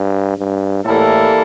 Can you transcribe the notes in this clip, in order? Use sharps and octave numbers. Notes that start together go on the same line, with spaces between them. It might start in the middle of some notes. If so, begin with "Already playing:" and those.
Already playing: G2
G2
A2 E3 G3 A#3 E4 A4